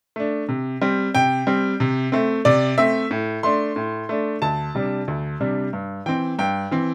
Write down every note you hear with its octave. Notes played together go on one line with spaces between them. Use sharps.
A3 D4
C3
G3 C4
C3 G5
G3 C4
C3
A3 C4
C3 D5
A3 C4 E5
A2
A3 D4 C6
A2
A3 D4
D2 A5
C3 G3 D4
D2
C3 G3 D4
G2
E3 C4 G5
G2 G5
E3 C4